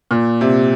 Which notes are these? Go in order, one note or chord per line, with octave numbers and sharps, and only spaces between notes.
A#2
C3